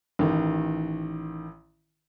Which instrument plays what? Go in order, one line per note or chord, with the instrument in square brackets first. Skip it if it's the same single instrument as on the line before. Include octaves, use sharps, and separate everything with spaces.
[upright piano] A1 D#3